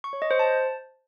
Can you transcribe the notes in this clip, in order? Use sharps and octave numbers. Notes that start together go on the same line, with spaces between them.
C#6
C#5
D#5
C5
A5